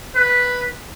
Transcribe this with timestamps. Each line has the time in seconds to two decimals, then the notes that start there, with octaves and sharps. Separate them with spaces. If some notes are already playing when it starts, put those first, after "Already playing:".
0.15 B4